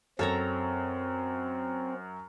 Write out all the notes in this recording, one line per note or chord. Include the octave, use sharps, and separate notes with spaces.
F#2 C4 A4 C#5 A#5